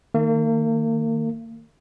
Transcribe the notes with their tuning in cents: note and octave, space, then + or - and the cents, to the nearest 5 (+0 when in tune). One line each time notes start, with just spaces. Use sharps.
D#3 +0 A#3 -40